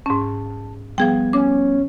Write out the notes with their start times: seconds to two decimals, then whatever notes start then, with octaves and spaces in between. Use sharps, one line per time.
0.06 G#2 C#4 A5
0.98 F3 G3 B3 G#4 G5 G#6
1.33 C#4 D6